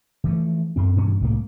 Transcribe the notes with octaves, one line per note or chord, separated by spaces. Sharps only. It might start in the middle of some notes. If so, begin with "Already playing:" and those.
E3 F3 A3
F#2 C4
G2 B2 E3 C#4
C2 A2 A#3